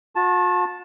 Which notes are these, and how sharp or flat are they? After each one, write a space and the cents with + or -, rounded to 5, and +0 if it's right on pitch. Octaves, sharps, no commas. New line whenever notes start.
F#4 -45 A5 +0